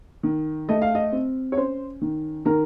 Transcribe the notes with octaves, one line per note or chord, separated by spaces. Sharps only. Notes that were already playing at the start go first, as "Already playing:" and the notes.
D#3
A3 D#5
F5
D#5
C4
C#5
C#4 C5
D#3
D#3 A#4